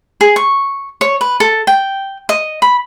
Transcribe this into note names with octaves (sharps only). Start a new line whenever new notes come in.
G#4
C#6
C#5
B4
A4
G5
D#5
B5